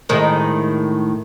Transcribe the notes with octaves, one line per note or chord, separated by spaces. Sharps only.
A2 D#3 G#3